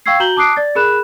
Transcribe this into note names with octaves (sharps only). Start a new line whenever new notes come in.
F5 G5 C#6 E6 G#6 C7
F#4 A#5 G6 F#7 G7
A5 D6 D#6 F#6 C7 D7
D5 A6
G#4 A#4 B5 F#6 E7